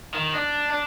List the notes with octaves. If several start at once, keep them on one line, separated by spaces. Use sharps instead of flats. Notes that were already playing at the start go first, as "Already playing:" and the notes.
D#3
D4
D4